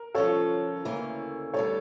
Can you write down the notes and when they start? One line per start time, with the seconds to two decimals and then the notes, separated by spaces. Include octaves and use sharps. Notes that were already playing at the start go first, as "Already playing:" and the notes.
Already playing: A#4
0.14 F3 C#4 F4 A4 C#5
0.85 D2 C#3 E3 A#3
1.54 D2 D3 G3 A4 C#5